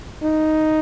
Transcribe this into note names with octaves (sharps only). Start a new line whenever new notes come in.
D#4